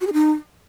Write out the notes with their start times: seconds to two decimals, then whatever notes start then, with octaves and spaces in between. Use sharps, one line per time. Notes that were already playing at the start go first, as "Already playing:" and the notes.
0.01 F#4
0.07 G#4
0.13 D#4